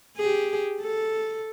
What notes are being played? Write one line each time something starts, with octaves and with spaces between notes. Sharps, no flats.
G4 G#4
A4